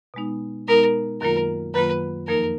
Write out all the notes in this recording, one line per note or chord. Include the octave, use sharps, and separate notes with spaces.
B2 G#3 B3 D#4
B2 G#3 B3 D#4 A#4
F#2 D#3 F#3 A#3 F4 A#4
F#2 D#3 F#3 A#3 F4 B4
F2 F3 A#3 D#4 A#4